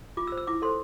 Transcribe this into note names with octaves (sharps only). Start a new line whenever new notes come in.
F4 D6
E6
C5
E6
E4 D6
A4 C5 C6